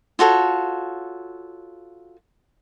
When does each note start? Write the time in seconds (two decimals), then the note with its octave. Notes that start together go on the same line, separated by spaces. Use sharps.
0.19 F4 F#4 A4 C#5